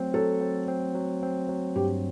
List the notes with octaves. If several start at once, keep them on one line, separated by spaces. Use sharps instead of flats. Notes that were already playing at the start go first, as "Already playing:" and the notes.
Already playing: F#3 A3 C4
F#3 A4
C4
C4
F#3
C4
F#3
G2 G4